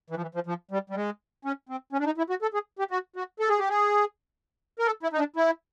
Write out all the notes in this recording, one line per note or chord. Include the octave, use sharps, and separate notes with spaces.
E3
F3
E3
F3
F3
G3
G3
G#3
C#4
C4
C#4
D4
D#4
E4
F#4
A4
G#4
G4
F#4
F#4
A4
G#4
G4
G#4
A#4
A4
E4
D#4
D4
E4